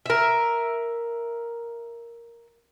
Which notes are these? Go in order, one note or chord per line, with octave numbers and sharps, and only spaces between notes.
A#4 E5